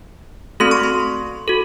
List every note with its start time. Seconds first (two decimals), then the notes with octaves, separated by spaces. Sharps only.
0.60 A3 C4 F#4 A4 C6
0.71 C#6
0.83 C6
1.48 F#4 A4